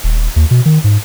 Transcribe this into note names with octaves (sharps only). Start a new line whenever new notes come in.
D#1
D#2
B2
D#3
G#2